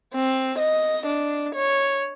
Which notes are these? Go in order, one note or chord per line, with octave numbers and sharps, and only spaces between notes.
C4
D#5
D4
C#5